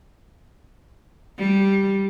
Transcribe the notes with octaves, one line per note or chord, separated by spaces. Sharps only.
G3